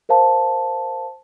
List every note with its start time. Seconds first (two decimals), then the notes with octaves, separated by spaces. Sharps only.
0.09 A#4 C5 F5 A5